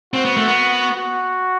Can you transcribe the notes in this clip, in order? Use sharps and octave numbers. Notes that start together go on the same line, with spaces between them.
C4 F#4
B3
A3
B3
F#4